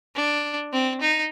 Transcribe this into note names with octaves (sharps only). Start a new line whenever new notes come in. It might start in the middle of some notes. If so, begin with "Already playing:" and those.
D4
C4
D#4